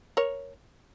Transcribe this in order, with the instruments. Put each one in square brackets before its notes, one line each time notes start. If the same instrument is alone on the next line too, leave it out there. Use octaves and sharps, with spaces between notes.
[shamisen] A#4 C#5